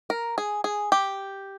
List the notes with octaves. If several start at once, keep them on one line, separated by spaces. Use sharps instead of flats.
A#4
G#4
G#4
G4